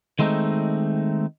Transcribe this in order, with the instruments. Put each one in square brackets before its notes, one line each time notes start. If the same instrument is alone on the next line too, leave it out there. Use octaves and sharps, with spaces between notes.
[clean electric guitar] D#3 G#3 A3 C4 D#4